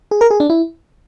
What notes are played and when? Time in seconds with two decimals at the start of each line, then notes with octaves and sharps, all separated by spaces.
0.11 G#4
0.21 A#4
0.30 G#4
0.40 D4
0.50 E4